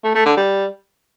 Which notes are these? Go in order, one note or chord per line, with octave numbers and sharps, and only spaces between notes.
A3
A3
D3
G3